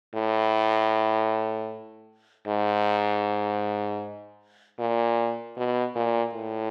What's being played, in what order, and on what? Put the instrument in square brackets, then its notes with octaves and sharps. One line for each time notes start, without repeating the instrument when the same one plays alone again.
[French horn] A2
G#2
A#2
B2
A#2
A2